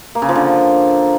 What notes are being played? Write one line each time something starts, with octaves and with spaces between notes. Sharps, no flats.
A#3
C#3
F3
D3